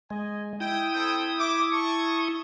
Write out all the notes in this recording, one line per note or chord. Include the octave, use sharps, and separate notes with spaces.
G#3 D#5 G#5
E4 G5 D#6
C4 A4 G5
E5 D6
A5 C#6